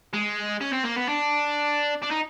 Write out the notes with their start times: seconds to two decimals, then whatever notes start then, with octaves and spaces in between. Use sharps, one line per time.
0.13 G#3
0.61 C#4
0.72 C4
0.84 A#3
0.96 B3
1.08 D4
2.02 D4
2.11 D#4